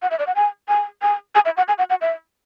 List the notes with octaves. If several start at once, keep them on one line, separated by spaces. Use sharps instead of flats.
F#5
E5
D5
F#5
G#5
G#5
G#5
G#5
E5
F#5
G#5
F#5
F#5
E5